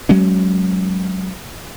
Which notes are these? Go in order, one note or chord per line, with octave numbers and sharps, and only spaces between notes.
F#3 G#3 C#4